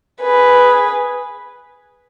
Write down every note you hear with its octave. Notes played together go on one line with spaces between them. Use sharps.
G#4 B4